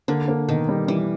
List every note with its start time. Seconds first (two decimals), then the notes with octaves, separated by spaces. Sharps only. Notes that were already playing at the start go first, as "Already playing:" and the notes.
0.08 D3 A#3
0.28 A#3
0.48 B2 D#3
0.69 G3
0.88 E3 G3